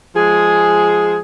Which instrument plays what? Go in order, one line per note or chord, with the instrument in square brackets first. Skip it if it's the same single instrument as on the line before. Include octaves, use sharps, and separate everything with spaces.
[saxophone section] F3 G#3 G#4